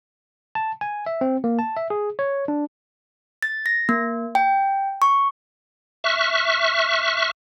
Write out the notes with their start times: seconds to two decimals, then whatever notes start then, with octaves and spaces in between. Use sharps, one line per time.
0.55 A5
0.81 G#5
1.06 E5
1.21 C4
1.44 A#3
1.59 A5
1.77 E5
1.90 G#4
2.19 C#5
2.48 D4
3.43 A6
3.66 A#6
3.89 A#3
4.35 G5
5.02 C#6
6.04 E5 C#6 F6 F#6